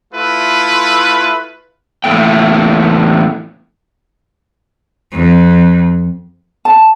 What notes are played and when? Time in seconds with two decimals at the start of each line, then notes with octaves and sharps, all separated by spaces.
0.14 A3 E4 F4 B4
2.04 E2 A2 C#3 A3 A#3 G5
5.12 F2
6.65 A5